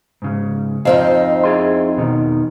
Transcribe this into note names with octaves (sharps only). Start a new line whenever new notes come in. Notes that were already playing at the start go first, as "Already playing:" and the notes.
G#2 C#3
F2 C4 D#4 C5 F5
E4 G#4 C6
E2 B2 D#3